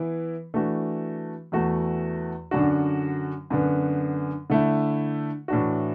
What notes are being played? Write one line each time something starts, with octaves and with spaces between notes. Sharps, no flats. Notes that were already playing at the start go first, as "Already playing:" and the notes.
Already playing: E3 B3 E4
E3 A3 D4 F#4
E2 E3 A3 F#4
F#2 D3 F#3 D4 F#4
F#2 D3 B3
D3 A3 E4
A2 E3 D4 F#4